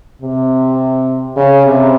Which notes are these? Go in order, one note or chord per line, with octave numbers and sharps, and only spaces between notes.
C3
C#3
C3